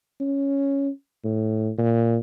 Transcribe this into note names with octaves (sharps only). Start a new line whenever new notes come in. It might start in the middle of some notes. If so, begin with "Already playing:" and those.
C#4
A2
A#2